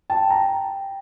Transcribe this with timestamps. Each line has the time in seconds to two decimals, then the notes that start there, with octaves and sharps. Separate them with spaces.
0.10 G5 A5
0.30 A#5